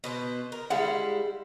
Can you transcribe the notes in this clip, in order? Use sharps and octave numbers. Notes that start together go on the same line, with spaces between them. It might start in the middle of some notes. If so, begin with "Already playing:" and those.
B2 B4 C5
A#4
G3 G#3 E4 F5 F#5